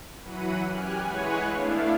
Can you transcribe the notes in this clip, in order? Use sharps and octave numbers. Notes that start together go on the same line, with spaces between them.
E3 F#3 F#5 B5 D#7
F#2 G4 G#5 F6 F#6
E3 G#3 B4 C#5 F#5 G#5
A3 B3 D4 E4 F5